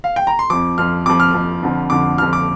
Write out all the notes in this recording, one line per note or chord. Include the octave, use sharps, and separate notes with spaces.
F5
G5
A#5
C6
F2 F3 D6
F2 F3 F6
F2 F3 D6
F6
F2 F3
F2 D3 F3
F2 D3 F3 D6
F2 D3 F3 F6
D6